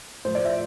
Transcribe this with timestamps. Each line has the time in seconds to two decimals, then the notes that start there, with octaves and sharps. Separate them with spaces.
0.25 A2 F3 C5
0.35 D5
0.45 E5